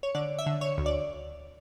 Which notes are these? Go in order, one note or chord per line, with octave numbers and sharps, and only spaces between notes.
C#5
D3 D5
E5
D3
C#5
D2
D5